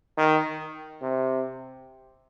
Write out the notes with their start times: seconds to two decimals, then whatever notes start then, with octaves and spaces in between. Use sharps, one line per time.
0.18 D#3
1.02 C3